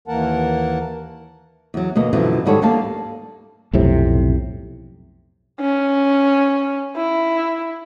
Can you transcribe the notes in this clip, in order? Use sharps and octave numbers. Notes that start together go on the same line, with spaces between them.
D#2 E3 A#3 A#4 F#5 A5
E2 F#3
D2 B2 A#3 D#5
F#2 B2 D3 E3 F3
G#2 D#3 G3 F#4 A4 C#5
D2 D3 G3 A#3 F5 A5
B1 F2 A2 C3
C#4
E4